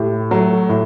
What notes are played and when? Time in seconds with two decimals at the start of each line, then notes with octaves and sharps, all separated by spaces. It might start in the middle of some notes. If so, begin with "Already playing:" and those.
Already playing: A2 G4
0.31 F#3 A3
0.69 A2